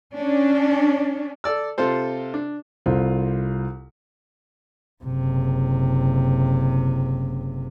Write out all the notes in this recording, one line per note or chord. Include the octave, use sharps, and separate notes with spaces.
C#4 D4
A4 D5 E6
C3 F4 A4 C5
D4
C2 F4 A4 C5
F#1 C3